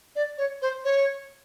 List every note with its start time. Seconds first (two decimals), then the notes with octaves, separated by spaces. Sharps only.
0.15 D5
0.37 C#5
0.61 C5
0.84 C#5